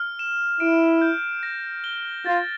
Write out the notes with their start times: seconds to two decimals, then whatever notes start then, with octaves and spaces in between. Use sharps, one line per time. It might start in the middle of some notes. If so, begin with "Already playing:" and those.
Already playing: F6
0.19 E7
0.60 E4 D7
1.02 G6
1.43 A#6
1.84 G7
2.25 F4 A6